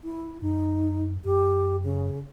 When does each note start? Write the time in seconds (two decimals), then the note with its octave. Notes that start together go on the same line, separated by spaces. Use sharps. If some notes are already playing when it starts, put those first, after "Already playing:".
0.04 E4
0.42 F#2 D#4
1.25 F#2 G4
1.83 C#3